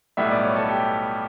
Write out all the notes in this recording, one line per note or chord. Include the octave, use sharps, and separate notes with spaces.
B1 A2 G3 B3 E5
D5
C#5
A4
G4